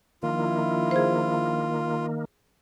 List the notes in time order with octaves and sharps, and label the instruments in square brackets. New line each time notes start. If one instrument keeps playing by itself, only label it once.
[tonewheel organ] D#3 A#3 [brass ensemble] F3 D4 E4 [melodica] F4
[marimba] G#4 C5